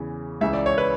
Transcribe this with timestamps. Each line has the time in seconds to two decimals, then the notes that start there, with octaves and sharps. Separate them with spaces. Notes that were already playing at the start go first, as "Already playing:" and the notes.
Already playing: E2 C#3 E3
0.41 C#2 C#3 E3 E5
0.53 D5
0.66 C#5
0.78 B4